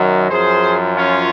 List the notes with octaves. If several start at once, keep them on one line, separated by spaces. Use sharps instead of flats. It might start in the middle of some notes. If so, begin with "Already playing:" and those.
Already playing: F#2 D#3 F#3
F#2 F3 G#4 C5
C#4 F4